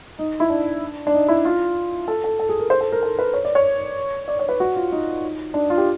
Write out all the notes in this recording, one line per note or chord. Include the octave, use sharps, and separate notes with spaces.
D#4
E4
D4
D4
D#4
E4
F4
A4
A4
A4
G#4
A#4
C5
A4
A#4
A4
B4
C#5
D5
C#5
D5
C#5
B4
F#4
F4
D#4
D4
F4
G4